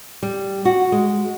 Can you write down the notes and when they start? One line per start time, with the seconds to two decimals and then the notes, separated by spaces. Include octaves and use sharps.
0.23 G3
0.65 F#4
0.92 G#3